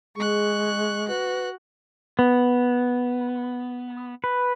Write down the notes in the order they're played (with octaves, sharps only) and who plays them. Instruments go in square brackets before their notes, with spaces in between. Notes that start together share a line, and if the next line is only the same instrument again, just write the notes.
[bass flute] G#3 [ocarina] G#4 [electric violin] C#6 F#6
[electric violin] F#4 F#6 [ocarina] B4
[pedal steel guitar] B3
B4